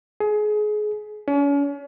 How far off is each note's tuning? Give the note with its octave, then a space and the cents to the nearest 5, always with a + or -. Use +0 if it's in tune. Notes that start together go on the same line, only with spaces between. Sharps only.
G#4 +25
C#4 +40